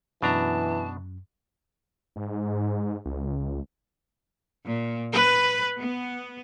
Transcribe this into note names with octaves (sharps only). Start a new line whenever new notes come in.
F#2 B2 E3 D4 A5 A#5
G#2
C#2
A#2
B4
B3